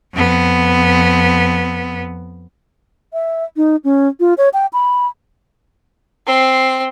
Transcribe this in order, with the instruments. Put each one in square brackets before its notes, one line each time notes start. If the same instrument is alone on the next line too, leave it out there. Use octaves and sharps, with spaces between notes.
[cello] F2 B3
[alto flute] E5
D#4
C#4
F4
C#5
G5
B5
[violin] C4 C7